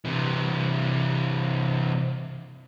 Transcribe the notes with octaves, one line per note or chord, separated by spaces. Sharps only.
C3 E3